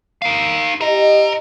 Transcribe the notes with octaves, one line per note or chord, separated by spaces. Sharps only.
D#4 F5
E4 G4 C5 D#5 A#5